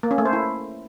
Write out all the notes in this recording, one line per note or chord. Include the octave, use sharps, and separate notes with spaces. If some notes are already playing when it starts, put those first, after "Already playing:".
A#3
C#4
A3
C5
E4